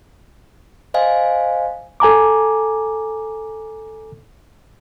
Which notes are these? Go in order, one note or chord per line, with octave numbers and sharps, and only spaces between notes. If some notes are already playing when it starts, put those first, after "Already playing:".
C5 D#5 F5 G#5
A4 G#5 A#5 D6